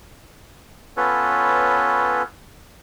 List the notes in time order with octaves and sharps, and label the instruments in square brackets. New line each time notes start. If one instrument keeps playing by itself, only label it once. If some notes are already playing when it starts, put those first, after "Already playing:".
[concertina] B3 C#4 F4 A4 B4 C#5